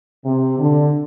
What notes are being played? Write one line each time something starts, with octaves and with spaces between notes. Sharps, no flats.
C3
D3